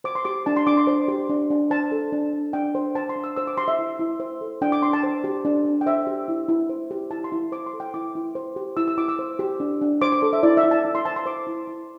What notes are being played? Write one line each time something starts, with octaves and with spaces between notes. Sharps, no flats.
C5 D6
C6
G4 D6
D4 A5
C6
D4 D6
C6
C5
G4
D4
D4
C5 A5
A4
D4
D4
D4 G5
C5
C5 A5
C6
D4
E6
C5 E6
D6
G4 C6
E5
E4
E4
C5
A4
D4 G5
D6
D4 C6
A5
C5
G4
D4
D4
G5
C5 E5
G4
E4
E4
C5
G4
E4 A5
C6
E4
C5 D6
C6
A4
G5
E4 D6
E4
C5
G4
E4 E6
E6
E4 D6
E6
C5
G4
D4
D4
C5 D6
D6
A4
E5
E4 D5
E5
E4
A5
E4
C6
C5 A5
C6
C5 D6
E4
E4